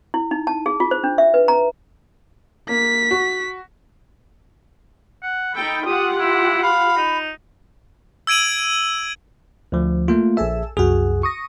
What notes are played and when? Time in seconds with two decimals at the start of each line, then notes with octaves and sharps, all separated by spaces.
0.14 E4
0.31 D#4
0.47 A5
0.66 G#4
0.80 F4
0.91 C5
1.04 D4
1.18 E5
1.34 B4
1.48 A#5
2.69 A#3 B6
3.11 F#4
5.23 F#5
5.55 D#4 A4 G5 B5
5.86 F4 G4 F#5 D#6
6.19 E4
6.63 F5 B5
6.97 D#4
8.27 E6 G#6 D7 D#7 F#7
9.72 D2 F3
10.08 A3 A#3 F4
10.37 A#1 G#4 A4 E5 E6
10.77 C2 F#2 F#4 G#4
11.23 C#6 D#6 A#6